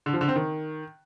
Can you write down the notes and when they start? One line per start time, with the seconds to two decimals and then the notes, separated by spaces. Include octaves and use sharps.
0.06 D3
0.13 F3
0.21 D3
0.28 C4
0.36 D#3